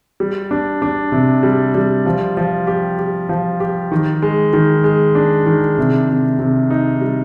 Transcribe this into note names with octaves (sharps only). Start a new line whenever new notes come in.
G3
D4
D4
C3
G3
G3
F3
F3
G4
G4
F3
G4
D#3
G#3
D#3
G#3
D4
D#3
C3
C3
C3
D#4
G3